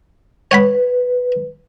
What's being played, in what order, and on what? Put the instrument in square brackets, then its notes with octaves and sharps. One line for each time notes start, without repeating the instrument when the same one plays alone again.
[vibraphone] B4 [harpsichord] C#5 F#5 B5